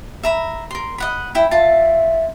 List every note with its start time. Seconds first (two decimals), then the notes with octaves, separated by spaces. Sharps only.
0.23 E5 A#5 B5
0.71 A#4 C6
0.98 D#5 F#5 B5
1.35 E4 G5 B5
1.51 F4 E5 A5